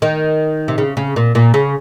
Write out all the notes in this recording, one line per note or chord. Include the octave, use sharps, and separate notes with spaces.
D#3
C3
C#3
C#3
A#2
A#2
C#3